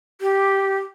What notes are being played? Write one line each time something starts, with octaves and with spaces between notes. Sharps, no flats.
G4